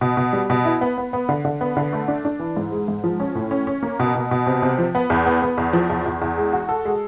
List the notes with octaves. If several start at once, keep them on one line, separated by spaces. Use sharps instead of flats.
B2
B2
G3
B2
E4
B3
B3
B3
D3
D3
B3
D3
A3
D4
D4
E3
G#2
G#3
G#2
F3
C#4
A2
C#4
C#4
A#3
B2
B2
B2
C3
C3
F3
B3
E2
B3
B3
E2
F3
E2
E2
E2
G#3
F#4
A4
G#3